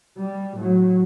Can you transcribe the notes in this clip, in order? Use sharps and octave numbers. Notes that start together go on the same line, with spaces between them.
G3
A2 F#3